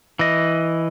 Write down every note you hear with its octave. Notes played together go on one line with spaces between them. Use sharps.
E3 D#5